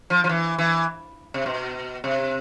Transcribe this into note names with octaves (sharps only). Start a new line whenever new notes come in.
F3
F3
E3
E3
C3
B2
C3